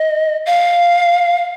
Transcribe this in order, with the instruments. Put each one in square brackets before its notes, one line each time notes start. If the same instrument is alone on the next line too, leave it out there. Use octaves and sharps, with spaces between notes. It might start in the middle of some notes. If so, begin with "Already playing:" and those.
Already playing: [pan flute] D#5
F5